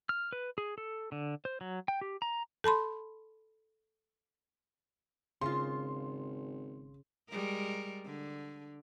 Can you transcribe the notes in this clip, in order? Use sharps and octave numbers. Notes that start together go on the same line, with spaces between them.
F6
B4
G#4
A4
D3
C5
F#3
G5
G4
A#5
A4 A5 B5 C6
G#1 C#3 F4 C6
G3 G#3 A#4
D3